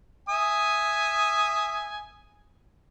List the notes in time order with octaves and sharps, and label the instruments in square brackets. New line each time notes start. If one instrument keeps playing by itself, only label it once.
[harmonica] E5 G#5 D#6